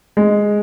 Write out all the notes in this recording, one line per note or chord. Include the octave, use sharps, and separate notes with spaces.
G#3